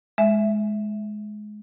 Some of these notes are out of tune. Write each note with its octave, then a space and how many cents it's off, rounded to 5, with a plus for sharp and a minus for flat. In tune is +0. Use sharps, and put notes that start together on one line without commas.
G#3 +20 E5 +0